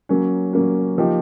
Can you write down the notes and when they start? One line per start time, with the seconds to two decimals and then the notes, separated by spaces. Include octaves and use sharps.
0.09 F#3 A#3 C#4
0.53 F#3 A#3 C#4
0.98 F3 A#3 D#4 G4